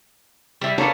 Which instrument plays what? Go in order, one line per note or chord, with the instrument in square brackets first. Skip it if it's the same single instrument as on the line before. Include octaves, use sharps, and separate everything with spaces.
[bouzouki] G3 E4
[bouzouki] A#3 B3 D4 [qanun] A4 C#5